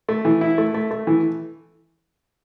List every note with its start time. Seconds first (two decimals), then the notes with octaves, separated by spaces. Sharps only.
0.09 A3
0.25 E3
0.41 E4
0.58 A3
0.74 A3
0.91 A3
1.07 E3